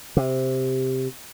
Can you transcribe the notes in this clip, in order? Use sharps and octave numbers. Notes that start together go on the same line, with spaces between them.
C3